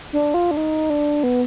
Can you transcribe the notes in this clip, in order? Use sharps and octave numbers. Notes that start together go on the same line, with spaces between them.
D4
F4
D4
D#4
D4
B3